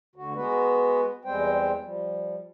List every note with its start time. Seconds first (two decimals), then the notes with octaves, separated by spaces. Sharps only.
0.16 D2 D3 F#4
0.35 G#3 B3 F#4 B4
1.25 E2 G3 G#3 C4 C5 G5
1.82 F3 G3